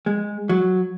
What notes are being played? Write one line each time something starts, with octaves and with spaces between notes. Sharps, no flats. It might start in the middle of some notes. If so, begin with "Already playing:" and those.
G#3
F#3